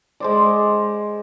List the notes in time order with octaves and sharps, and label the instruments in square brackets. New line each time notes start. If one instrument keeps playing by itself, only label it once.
[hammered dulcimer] G#3 C5 D5